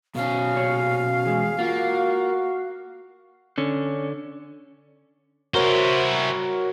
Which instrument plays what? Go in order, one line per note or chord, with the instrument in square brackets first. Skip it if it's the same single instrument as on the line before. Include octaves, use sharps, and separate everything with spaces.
[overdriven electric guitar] B2 C#4 [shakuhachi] F5
[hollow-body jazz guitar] A#2 C#3 C#5
[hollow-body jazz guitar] E3 G#3 [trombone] G#4
[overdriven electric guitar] A#3 [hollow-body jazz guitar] F4 [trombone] F#4
[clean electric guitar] D3 C#4
[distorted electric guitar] E4 C5 [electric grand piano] F#4 A#4 C#5